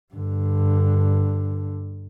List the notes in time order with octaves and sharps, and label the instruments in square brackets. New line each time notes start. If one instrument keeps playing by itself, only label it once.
[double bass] G2 D3